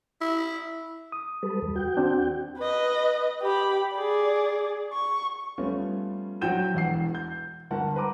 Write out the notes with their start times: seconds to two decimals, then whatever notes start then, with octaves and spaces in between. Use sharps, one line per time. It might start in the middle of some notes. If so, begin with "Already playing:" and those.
0.21 E4
1.12 D#6
1.43 G3 A4 B4
1.62 E2
1.76 F#4 G5
1.97 D#2 C4 D4
2.59 B4 D#5
3.42 G4 B5
3.94 G#4 D5
4.93 C#6
5.58 F3 G3 A3 B3 C#4 F4
6.41 A#1 F#3 F#5 G5 G6 E7
6.74 E1 E2 F#5 C7
7.15 G6
7.71 G1 A#4 F#5 A5
7.96 B4 A#5 D6